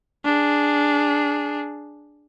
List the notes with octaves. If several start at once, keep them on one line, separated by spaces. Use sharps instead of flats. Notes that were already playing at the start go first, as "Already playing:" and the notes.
D4 G#4